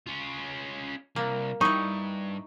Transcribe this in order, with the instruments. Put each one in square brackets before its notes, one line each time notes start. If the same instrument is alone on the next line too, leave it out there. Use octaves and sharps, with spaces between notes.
[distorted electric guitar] C#4 F4
[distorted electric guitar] C2 [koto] A#3
[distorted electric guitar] G2 [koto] D#4 E4 [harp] C#6